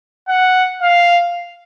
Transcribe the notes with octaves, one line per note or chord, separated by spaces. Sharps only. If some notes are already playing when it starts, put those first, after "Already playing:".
F#5
F5